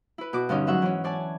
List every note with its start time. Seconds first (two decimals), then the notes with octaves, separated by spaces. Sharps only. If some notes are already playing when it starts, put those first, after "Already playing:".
0.18 E4 B4
0.33 B2 F#4 D6
0.49 G2 D3 C#4 D#4
0.67 G#2 F#3 G#3 E5 F#5 C#6
0.82 E3 C#4
1.04 C#5 D5 G#5 A5